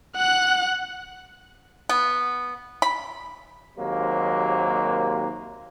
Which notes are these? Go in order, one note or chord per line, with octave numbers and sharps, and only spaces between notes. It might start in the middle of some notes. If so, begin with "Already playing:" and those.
F#5 F#6
B3
B5
D#2 G#2 C3 F#3 A#3